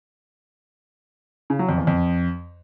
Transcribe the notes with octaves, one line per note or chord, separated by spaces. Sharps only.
C#3
F#3
F2
E2
F2